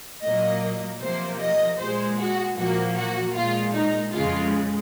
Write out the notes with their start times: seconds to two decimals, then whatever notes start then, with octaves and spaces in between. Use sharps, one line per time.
0.23 A#2 F#3 A#3 D#5
1.01 C3 F3 A#3 C5
1.40 D#5
1.78 A#2 G#3 C5
2.19 F#4
2.58 A#2 F3 A#3 F#4
2.96 F#4
3.35 A#2 G#3 F4
3.74 D#4
4.13 F2 C#3 G#3 F4